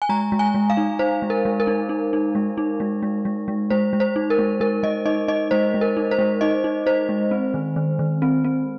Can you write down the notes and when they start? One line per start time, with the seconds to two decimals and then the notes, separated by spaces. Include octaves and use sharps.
0.02 G#5
0.09 G#3 A#5
0.32 G#3
0.39 G#5
0.55 G#3
0.70 F5
0.77 D#4
0.99 D#4 C5
1.22 G#3
1.30 A#4
1.45 G#3
1.60 A#4
1.67 D#4
1.89 D#4
2.13 D#4
2.35 G#3
2.58 D#4
2.80 G#3
3.03 G#3
3.25 G#3
3.48 G#3
3.70 G#3 C5
3.93 G#3
4.00 C5
4.16 D#4
4.30 A#4
4.39 G#3
4.60 G#3 A#4
4.83 G#3 D#5
5.06 D#4 D#5
5.28 D#4 D#5
5.51 G#3 C5
5.74 G#3
5.81 A#4
5.97 D#4
6.11 C5
6.19 G#3
6.41 D#4 D#5
6.64 D#4
6.86 D#4 C5
7.09 G#3
7.31 C4
7.54 D#3
7.76 D#3
7.99 D#3
8.22 C4
8.44 C4